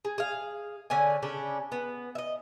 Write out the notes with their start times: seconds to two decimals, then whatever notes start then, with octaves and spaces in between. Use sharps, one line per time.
0.05 G#4
0.18 G#4 F5
0.90 D3 C#4 D5 G#5
1.22 C#3 C#4 D4 A4
1.72 B3
2.15 D#5 E5